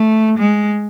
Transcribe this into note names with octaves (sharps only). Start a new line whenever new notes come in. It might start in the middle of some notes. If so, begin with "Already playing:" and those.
Already playing: A3
G#3